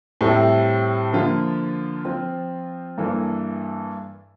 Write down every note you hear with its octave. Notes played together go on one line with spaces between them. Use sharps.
A2 G3 C4 E4 A4
D3 F3 A#3 F4
F3 C4 F4
G2 E3 A#3 D4 A4